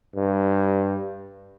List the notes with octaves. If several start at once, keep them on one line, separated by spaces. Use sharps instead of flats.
G2